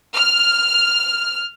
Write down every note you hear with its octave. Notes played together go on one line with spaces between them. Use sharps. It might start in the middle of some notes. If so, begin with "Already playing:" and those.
F6